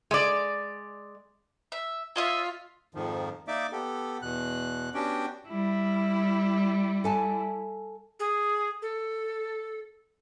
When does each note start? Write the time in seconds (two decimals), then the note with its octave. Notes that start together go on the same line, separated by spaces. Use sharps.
0.11 G#3 D5
1.72 E5
2.16 F4 C#5 D#5 E5
2.95 F2 G#2 D#3 F3
3.48 A#3 D#4 D5 E5 D6
3.72 B3 G4 A4
4.22 E2 B2 F#6
4.94 B3 C#4 D4 F#4 G4 G5
5.49 G3 E4
7.04 A4 G#5 A5
8.20 G#4
8.82 A4